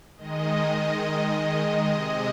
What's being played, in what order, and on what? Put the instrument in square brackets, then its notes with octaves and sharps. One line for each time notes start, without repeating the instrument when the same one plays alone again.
[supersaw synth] D#3 G#3 D#5
C3 G#3 D#5